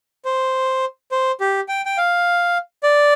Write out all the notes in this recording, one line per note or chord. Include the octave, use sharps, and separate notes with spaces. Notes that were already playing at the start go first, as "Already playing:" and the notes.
C5
C5
G4
G5
G5
F5
D5